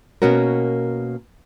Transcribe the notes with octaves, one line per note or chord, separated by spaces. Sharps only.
B2 A#3 B3 C#4 F#4 A#4